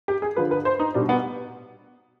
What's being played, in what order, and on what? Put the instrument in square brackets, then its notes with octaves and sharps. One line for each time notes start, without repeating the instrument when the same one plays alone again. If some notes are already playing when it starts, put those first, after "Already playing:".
[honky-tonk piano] G4
G#4
D3 F3 B4
B4
C5
D#4
B2 G3 D4
B3